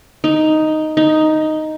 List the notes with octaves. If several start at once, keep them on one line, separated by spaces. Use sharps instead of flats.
D#4
D#4